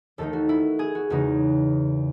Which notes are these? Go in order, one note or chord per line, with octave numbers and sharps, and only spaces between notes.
D#2 D#3 A3 D#4 A4
F#4
E4
G#4
F#4
E2 C#3 G#3 D#4 F#4